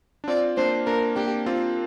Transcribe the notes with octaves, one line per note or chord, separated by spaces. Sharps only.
D4
C4 F4 D5
A#3 D4 C5
A#3 D4 A#4
A#3 D4 G4
C4 F4